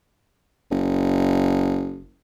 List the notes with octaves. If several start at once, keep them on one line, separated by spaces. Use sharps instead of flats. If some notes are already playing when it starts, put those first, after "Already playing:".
F#1